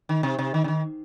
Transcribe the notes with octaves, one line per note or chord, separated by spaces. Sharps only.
D#3
C3
C3
D#3
C3
D#3